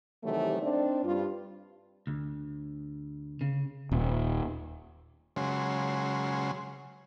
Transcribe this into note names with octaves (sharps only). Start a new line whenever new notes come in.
C3 D#3 E3 F#3 G3 A3
C4 D4 D#4 D5
G2 F4
D2
C#3
D#1
C#3 F#3 G#3 C6